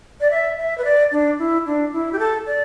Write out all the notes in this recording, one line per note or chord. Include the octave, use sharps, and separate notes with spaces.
D5
E5
E5
B4
D5
D4
E4
D4
E4
G4
A4
D5